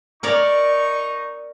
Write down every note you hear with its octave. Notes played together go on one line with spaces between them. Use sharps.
D#4 A#4 C#5 D5 C#6